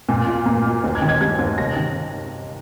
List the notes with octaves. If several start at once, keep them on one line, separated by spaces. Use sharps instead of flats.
A#2
F4
A#3
F4
D#2
G#6
D#3
G#6
G3 G#6
D#2
C3 A#6
D#3